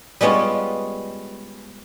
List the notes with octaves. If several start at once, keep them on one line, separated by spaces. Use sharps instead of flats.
G3 G#3 B3 C#4 F4